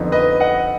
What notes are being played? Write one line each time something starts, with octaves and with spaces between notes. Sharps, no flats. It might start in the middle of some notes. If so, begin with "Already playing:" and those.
Already playing: F2 D3 F3 B3 D#4
B4 D#5
D#5 F#5